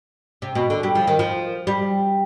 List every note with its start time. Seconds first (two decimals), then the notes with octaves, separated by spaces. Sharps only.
0.42 C3
0.55 B2
0.70 D3
0.83 G3
0.95 F3
1.07 D#3
1.19 F3
1.67 G3